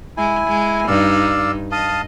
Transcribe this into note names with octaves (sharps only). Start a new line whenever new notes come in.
G#3 E4 G#5
G#3
G2 D#4 D5 F5 E6
D#5 F5 A5 D#6